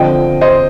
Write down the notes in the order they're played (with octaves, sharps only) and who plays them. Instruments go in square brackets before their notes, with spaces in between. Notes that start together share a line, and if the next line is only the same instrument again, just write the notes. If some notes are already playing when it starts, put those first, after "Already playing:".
Already playing: [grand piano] D3 F3 C4 D#5 G5
C5 D#5